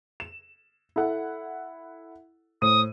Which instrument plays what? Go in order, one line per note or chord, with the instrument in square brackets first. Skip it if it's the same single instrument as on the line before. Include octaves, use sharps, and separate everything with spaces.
[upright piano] E7
E4 A4 F#5
[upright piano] A2 C5 D#7 [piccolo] D#6